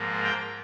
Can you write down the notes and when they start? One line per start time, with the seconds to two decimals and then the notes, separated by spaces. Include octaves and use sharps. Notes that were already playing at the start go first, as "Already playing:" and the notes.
Already playing: G#2 F3 A#3
0.24 G5